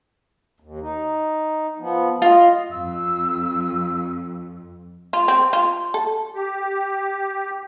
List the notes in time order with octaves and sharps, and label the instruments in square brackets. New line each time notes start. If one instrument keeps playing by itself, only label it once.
[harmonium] D#2
D#4
F3 B3
[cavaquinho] F4 [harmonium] D#5
[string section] F2 [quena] E6
[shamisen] F4
C4
F4
A4
[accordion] G4